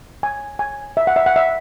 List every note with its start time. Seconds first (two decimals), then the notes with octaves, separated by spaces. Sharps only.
0.23 G#5
0.59 G#5
0.97 E5
1.07 F#5
1.16 E5
1.26 F#5
1.36 E5